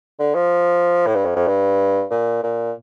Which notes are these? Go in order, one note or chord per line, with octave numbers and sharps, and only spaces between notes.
D3
F3
A2
G2
F2
F2
G2
A#2
A#2